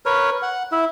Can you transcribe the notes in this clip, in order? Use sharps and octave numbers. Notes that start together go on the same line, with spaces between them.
A#4 B4 C#5
F#5
E4 E5